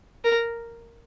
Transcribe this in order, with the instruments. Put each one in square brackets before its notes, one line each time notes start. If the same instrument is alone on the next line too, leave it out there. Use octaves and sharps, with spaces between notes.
[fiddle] A#4